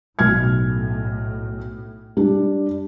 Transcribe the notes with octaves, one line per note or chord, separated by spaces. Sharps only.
B1 A2 F6 G#6
G3 D4